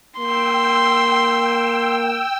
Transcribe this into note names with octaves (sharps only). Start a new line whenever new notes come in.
A#3 G5 C6 E6